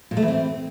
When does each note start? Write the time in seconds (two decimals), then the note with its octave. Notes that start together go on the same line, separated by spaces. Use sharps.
0.11 A#2
0.17 A3
0.22 E3
0.28 C4